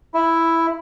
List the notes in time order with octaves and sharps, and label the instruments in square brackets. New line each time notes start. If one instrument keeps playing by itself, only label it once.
[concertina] E4